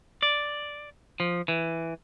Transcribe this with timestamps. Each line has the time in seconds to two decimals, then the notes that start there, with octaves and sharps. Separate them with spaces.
0.23 D5
1.20 F3
1.48 E3